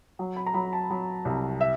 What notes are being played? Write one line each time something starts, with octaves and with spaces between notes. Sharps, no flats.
F#3
B5
A#5
F#3 B5
A5
F#3
C2
E5